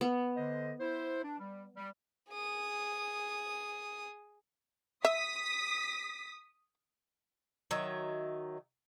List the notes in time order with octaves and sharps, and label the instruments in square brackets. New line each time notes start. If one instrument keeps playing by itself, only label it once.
[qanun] B3
[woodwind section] D3 C5 D#5
E4 C5
D4
G3
G3
[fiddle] G#4 D#6
[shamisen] E5 [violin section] D#6 B6
[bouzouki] D#3 F#3 E5